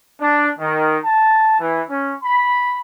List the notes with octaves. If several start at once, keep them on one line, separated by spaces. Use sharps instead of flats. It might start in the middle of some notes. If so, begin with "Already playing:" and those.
D4
D#3
A5
E3
C#4
B5